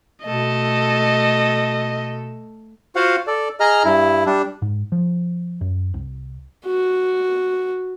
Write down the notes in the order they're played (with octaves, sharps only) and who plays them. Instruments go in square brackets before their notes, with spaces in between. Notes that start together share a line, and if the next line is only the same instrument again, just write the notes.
[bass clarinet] B2 [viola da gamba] A3 A4 [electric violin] D#5
[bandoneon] F4 F#4 C5 F5 F#5
A4 D5
G#4 D#5 A#5 F6
G2 E4
G3 D4
[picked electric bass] G#2
F3
F#2
C2
[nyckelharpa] F#4